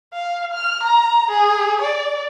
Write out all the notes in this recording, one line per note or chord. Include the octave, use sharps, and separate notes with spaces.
F5
F6
A#5
G#4
D5